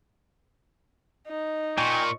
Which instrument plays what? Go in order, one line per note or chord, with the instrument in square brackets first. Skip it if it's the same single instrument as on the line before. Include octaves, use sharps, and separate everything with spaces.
[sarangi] D#4
[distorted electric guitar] A#2 [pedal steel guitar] A#4 G5 G#5 [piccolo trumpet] C#6